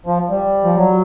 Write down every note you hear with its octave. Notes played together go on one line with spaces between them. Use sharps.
F3
G3
F3
F#3